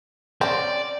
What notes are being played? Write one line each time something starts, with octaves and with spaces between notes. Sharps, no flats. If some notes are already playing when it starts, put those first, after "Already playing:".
C4 C#4 D5